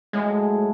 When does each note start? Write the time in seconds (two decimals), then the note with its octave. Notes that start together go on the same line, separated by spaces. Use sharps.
0.13 A2 F#3 G#3 A3
0.53 A2 F#3 A3